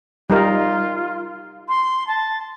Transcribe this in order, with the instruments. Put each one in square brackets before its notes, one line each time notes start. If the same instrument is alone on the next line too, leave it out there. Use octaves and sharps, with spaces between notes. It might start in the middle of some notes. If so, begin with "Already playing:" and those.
[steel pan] G3 D#4 A#4 [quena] F4
[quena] C6
A5